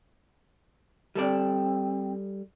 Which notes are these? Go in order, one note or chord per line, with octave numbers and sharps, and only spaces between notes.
G3 C4 A4 D5